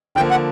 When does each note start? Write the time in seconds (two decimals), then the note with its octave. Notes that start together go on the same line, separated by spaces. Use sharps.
0.16 D3 F3 A#3 G5
0.31 F#5